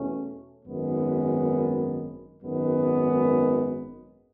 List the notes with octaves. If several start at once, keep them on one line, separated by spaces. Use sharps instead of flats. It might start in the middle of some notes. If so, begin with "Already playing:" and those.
Already playing: E2 B2 A3 C#4
G#1 F#2 D#3 G#3 B3
G#1 F#2 D#3 G#3 B3